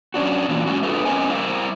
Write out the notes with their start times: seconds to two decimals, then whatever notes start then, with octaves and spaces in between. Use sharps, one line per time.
0.14 F#3 C#4 D4 F#4
0.49 A#2 E3 A#3 C#4 D4 F4
0.66 G3 G#3 C#4 F#4
0.83 D4 F4 G#4 A4 B4 E5
1.05 C4 C#4 A#4 C5 D#5 G#5
1.29 G3 E4 A#4 C5 E5 F5